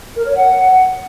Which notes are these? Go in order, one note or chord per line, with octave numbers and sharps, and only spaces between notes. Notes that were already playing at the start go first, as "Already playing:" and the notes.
A#4
C#5
F#5